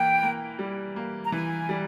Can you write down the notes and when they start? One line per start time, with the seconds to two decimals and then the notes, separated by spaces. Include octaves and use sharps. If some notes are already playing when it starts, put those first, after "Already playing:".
Already playing: E3 A#3 G5
0.23 A#3
0.59 G3
0.96 A#3
1.24 A#5
1.32 E3 G#5
1.69 G3